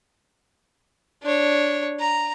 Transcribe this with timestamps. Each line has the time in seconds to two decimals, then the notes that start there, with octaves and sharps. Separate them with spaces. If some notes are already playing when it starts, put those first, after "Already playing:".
1.23 D4 C#5
1.99 A#5